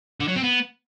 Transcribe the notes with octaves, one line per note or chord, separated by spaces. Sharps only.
D3
F#3
C4
B3